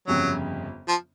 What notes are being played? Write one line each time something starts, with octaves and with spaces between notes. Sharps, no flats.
G1 F2 C#3 F#3
F3